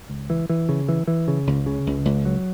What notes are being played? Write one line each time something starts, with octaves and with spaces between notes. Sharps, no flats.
C#2
E3
E3
C#3
E3
E3
C#3
C#2
C#3
C#2
C#2
F#3